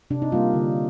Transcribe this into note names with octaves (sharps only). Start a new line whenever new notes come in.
C3 D4
D#4
G3 A#3 F4
D3